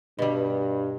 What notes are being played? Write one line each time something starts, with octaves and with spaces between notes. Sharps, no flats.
G2 B2 G3